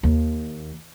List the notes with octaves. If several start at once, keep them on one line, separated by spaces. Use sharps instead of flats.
D#2